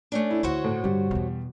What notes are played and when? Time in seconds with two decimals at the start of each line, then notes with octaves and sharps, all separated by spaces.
0.12 A3 C#4 D4
0.30 E4
0.43 D2 F#4 C5 C#5
0.64 A2
0.84 G2 D3 G3
1.11 E2 B2